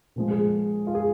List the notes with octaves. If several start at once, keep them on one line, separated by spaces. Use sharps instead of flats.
A#2 F3 G#3
G#4
F4
G#4